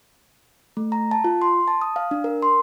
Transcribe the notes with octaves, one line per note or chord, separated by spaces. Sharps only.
A3
A#5
A5
F4
C6
A5
D#6
F5
D4
A#4
C6